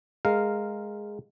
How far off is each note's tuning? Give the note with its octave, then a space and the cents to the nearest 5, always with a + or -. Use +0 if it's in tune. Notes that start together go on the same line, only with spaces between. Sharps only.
G#3 +0 A#4 -10 F5 +0